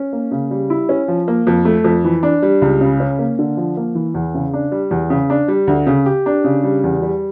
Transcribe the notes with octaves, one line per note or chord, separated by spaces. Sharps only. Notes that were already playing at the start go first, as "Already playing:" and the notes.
Already playing: C#4
A#3
C#3
G3
E4
C#4
F3
A#3
F2
A3
F2
E3
D4
G3
C#2
C#3
C#4
A#3
D3
F3
A#3
E3
E2
C#3
D4
G3
E2
C#3
D4
G3
D2
C#3
G4
D4
C#3
G3
E2
G3